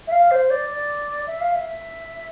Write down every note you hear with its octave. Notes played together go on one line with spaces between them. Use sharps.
E5
F5
C5
D5
D5
E5
F5
E5
E5